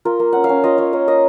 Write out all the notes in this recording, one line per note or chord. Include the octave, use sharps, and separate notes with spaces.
F4 A#4
A#3
C#4 F#5
F5
C#4
F4 D#5
F4 C#5
A#3 C#5
A#3 D#5